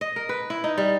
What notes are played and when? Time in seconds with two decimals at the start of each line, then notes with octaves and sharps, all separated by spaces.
0.01 D#5
0.16 A#4
0.29 B4
0.50 E4
0.64 D#4
0.78 G3